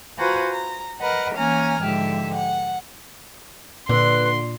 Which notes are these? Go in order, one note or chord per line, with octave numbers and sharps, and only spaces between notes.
F4 F#4 B4 C5 G#5 A#5
A#5
A#4 B4 D#5 F#5
E3 A#3 C#4 G#5 A#5 F6
G#2 D3 F3 G4 E5
F#5
A#2 D3 B4 C6